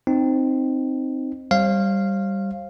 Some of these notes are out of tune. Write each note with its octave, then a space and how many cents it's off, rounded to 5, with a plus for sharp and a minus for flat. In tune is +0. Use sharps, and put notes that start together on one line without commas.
C4 +0 D#4 -10
G3 +0 C5 +40 F5 -10